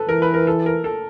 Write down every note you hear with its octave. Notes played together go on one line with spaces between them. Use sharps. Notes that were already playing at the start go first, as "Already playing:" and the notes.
Already playing: A4 B4
E3 A#4
B4
A#4
A4
A#4
A4